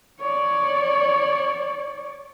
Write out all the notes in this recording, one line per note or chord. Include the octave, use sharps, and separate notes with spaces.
C#5 D5